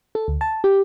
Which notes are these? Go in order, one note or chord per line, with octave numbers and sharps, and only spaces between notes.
A4
D2
A5
G4